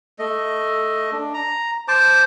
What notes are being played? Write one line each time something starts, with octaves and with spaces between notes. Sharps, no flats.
A3 D#5
D4
A#5
C5 A5 D6